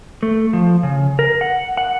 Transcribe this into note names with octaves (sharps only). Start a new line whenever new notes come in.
A3
F3
C#3
A#4
F#5
F#5